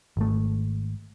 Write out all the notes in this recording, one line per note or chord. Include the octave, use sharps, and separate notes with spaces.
G#1 A3